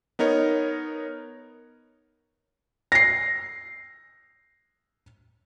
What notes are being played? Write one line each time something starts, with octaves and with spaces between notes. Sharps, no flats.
B3 D#4 A#4 C#5
A#6 C7